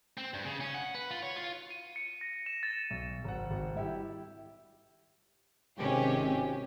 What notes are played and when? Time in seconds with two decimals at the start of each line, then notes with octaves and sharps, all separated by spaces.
0.18 C4
0.34 G2
0.45 C#3
0.61 C#4
0.74 F#5
0.95 B4
1.11 F4
1.23 C#5
1.36 F4
1.71 D#7
1.96 C#7
2.21 A#6
2.46 E7
2.63 A6
2.90 B1
3.24 G#1 F#5
3.51 G#1
3.74 G3 E4 G4
5.79 G#1 C3 C#4 G4